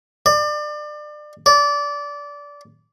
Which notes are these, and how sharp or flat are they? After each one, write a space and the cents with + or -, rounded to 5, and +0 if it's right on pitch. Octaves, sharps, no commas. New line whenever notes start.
D5 +30
D5 -20